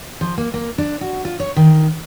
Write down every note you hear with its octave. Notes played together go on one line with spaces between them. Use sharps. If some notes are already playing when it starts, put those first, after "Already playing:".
F3
A#3
A#3
D4
F#4
F4
C#5
D#3